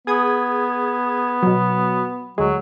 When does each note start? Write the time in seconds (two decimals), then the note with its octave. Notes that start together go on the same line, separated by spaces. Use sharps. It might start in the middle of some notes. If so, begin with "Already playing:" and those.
0.07 B3 G#4 D#6 G#6
1.43 B2 F#3
2.38 D2 F#3 G#3